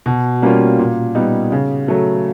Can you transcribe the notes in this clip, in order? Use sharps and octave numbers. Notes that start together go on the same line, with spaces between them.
B2
G3 A#3 C#4 F4
A#2
G3 B3 D#4
C#3
F#3 A3